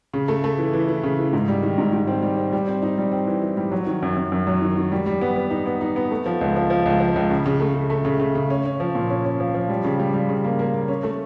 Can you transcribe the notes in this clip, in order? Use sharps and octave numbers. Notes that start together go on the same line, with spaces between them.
C#3
A3
A3
E3
E3
E3
C#3
E3
G#2
G3
D#3
G#2
G#2
C4
G3
C4
G3
C4
D#4
G3
C4
E3
E3
G3
F#3
D#3
F#2
F#2
F#2
F#3
D#3
D#3
G3
G3
B3
B3
D#4
B3
D#4
B3
A3
F3
C#2
F3
F3
C#2
F3
C#2
C#3
C#3
A3
C#3
A3
C#3
C#3
C#3
C#4
C#4
F3
A#2
C#4
C#4
F3
F3
G3
C#3
G3
G3
C#3
A#3
A#3
A#3
C#4
A3